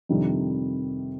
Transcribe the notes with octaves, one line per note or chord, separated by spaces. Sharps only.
F2 C3 D#3 G3 D4